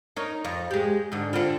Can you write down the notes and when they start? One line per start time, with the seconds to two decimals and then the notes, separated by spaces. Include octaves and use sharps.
0.16 D#4 A#4 C#5
0.45 F2
0.71 G#3 G4
1.12 G#2 D3
1.33 D3 C4 F4